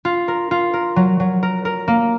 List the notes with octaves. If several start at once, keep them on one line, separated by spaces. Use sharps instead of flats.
F4
A#4
F4
A#4
F#3
F#3
A#4
A#4
A#3